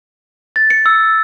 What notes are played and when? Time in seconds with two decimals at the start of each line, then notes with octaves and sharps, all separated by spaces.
0.56 A6
0.70 C#7
0.86 E6